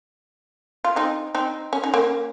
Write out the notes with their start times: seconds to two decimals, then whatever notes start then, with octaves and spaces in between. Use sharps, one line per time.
0.84 F4
0.96 C4 D#4
1.35 C4 D#4
1.73 C#4
1.84 D#4
1.94 A#3 C#4